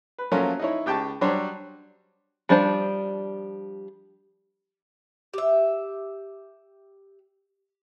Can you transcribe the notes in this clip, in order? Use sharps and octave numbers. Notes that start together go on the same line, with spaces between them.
B4
F3 F#3 A3 A#3 C#4 F4
D#4 E4 C#5
C#2 G4 G5 A5 C#6
F#3 G3 D4 C5 C#5
F3 G3 D4 C5 A5
G4 E5